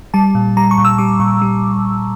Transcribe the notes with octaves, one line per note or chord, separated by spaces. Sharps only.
G3 A5
A#2
G3 A#5
C#6
A#2
E6
G3 D6
A#2 C#6
G3